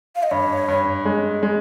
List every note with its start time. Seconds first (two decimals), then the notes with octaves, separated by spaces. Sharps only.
0.16 F5
0.23 D#5
0.31 G2 C#5
0.68 G2
1.05 G#3
1.43 G#3